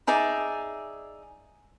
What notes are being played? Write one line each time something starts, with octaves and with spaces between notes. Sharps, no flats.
D#4 G#4 D5 E5